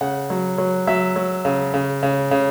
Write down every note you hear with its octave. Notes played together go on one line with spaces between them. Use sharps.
C#3 F#5
F#3
F#3
F#3 E5
F#3
C#3
C#3
C#3
C#3